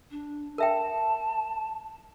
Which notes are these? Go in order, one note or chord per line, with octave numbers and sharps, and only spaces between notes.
D4
A#4 E5 G5 A5